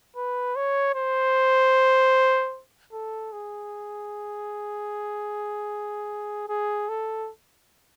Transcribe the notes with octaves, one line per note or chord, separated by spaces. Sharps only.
B4
C#5
C5
A4
G#4
G#4
A4